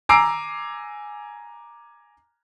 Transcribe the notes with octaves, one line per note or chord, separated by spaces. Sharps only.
G#5 A#5 D6 E6 C7 D7